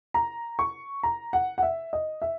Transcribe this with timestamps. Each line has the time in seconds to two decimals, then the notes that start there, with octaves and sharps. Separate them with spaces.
0.14 A#5
0.59 C#6
1.03 A#5
1.33 F#5
1.58 F#5
1.62 E5
1.93 D#5
2.22 E5